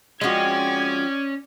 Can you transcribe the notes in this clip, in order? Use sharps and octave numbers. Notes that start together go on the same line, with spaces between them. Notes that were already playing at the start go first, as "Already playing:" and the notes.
F3 G#3 C4 C#4 F#4 D5 G#6